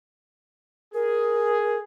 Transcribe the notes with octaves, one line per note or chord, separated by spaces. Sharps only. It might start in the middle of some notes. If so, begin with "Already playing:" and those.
G#4 A#4